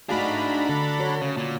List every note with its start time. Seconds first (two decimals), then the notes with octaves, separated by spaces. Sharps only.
0.09 A3 D4 D#4 F#4 G#4 F5 A#5 B5
0.69 D3 A4
0.99 F#4 C#5
1.21 C#3
1.37 A#2